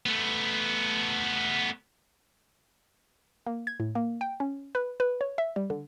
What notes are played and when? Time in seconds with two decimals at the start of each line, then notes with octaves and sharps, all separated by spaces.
0.06 A3 B3
3.47 A#3
3.67 G#6
3.80 A2
3.95 A#3
4.21 G5
4.40 C#4
4.75 B4
5.00 B4
5.21 C#5
5.38 E5
5.56 G3
5.70 D3